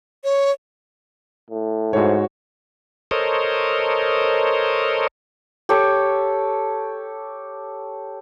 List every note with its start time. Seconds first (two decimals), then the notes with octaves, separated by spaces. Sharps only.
0.24 C#5
1.50 A2
1.93 G#2 F#4 C5 C#5
3.11 A4 A#4 C5 C#5 D#5
5.69 G4 A4 C#5